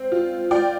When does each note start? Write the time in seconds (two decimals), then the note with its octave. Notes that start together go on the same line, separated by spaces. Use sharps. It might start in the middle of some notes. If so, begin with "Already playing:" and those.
Already playing: C4
0.12 F4
0.51 F4 D5 G5